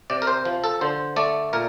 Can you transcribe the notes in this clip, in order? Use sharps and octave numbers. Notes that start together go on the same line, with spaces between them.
C3 D5
A#4
C5
F3
A4
D3 C5
A3 D5
A#2 A#4